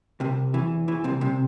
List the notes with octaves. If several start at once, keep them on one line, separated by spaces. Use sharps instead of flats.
C2 C3
E2 E3
E2 E3
C2 C3
C2 C3